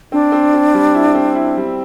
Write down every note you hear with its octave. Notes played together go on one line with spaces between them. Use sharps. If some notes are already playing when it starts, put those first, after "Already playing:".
C4 D4
C4
C4
G3
E4
C4
E4
G3